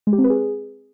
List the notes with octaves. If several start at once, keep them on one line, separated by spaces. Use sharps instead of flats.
G#3
G4
C4
B4
G#4